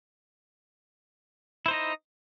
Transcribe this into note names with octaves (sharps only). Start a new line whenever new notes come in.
D#4 E4 C5 D#5